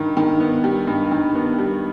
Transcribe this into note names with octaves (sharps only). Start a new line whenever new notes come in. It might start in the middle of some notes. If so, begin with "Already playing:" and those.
Already playing: G2 D#3
D#3
B3
G3
G2
D#3
B3
G3